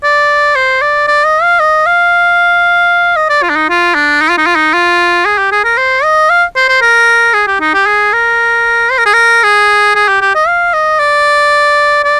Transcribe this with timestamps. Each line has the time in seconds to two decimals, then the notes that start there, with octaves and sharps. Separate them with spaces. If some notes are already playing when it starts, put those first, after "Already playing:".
0.03 D5
0.55 C5
0.82 D5
1.08 D5
1.26 D#5
1.42 F5
1.60 D#5
1.86 F5
3.16 D#5
3.29 D5
3.42 F4
3.50 D4
3.56 D#4
3.69 F4
3.95 D4
4.21 D#4
4.30 F4
4.38 D#4
4.46 F4
4.55 D#4
4.73 F4
5.26 G#4
5.38 G4
5.52 G#4
5.64 A#4
5.78 C5
6.03 D#5
6.30 F5
6.56 C5
6.69 C5
6.81 A#4
7.34 G#4
7.47 G4
7.61 D#4
7.74 G4
7.86 G#4
8.13 A#4
8.91 C5
8.98 A#4
9.06 G#4
9.13 A#4
9.43 G#4
9.95 G#4
10.08 G4
10.21 G4
10.35 D#5
10.47 F5
10.73 D#5
10.99 D5
12.04 D5